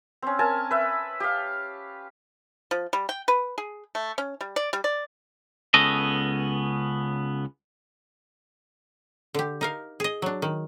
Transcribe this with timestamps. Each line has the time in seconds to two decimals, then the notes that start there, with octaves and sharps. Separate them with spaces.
0.22 C4 C#4
0.39 A#4 G#5 A5
0.71 B4 E5
1.20 G4 F5
2.71 F3
2.93 G3
3.09 G5
3.28 B4
3.58 G#4
3.95 A3
4.18 C#4
4.41 G3
4.56 D5
4.73 G3
4.84 D5
5.74 C#2 B3 C#4 A4 D#5
9.35 D3 G4
9.61 D#4 A#4 F5
10.00 G#4 D#5
10.22 F#3 D4
10.42 D#3